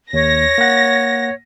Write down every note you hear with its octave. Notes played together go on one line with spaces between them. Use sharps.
D#2 C#5 A#6
A#3 F#5